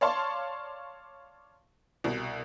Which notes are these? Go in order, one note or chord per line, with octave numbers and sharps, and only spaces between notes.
C#5 D5 F5 A5 C6 C#6
C2 B2